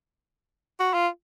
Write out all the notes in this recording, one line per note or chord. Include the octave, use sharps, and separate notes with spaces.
F#4
F4